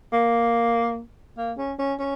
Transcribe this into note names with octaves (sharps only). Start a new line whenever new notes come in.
A#3
A#3
C#4
C#4
C#4